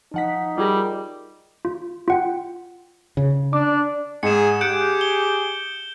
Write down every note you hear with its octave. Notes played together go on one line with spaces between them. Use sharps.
F3 D#4 F#5 B6
G3 F4 G#4 A#4
F4
F4 F#5 G5
C#3
D4 D6
G#2 G#4 C#7 E7
G4 G#4 F#6 G6 C#7 D7
G7